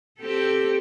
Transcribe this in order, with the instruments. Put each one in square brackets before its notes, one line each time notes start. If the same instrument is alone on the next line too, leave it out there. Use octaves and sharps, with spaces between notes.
[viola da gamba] C4 G4 A4